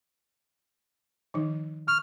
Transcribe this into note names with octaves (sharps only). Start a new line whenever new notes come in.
D#3 F3 D#4
C#6 F6